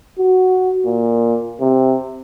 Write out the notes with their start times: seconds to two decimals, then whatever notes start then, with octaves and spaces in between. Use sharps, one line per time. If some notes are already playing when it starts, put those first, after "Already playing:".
0.19 F#4
0.86 A#2
1.61 C3